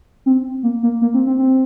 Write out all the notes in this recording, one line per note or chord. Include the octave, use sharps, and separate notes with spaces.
C4
A#3
A#3
A#3
C4
C4
C4